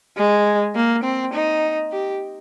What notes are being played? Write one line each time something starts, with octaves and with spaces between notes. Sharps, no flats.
G#3
A#3
C4
D#4
G4